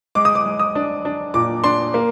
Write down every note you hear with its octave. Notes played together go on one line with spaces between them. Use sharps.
G#3 D6
D#6
D6
G#3
D#6
D4
D4
A#2 D6
D4 C6
A#3